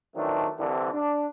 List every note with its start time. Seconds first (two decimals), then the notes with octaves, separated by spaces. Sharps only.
0.15 D#3 E3 F#3 A3 C4 D4
0.58 C2 D3 E3
0.93 D4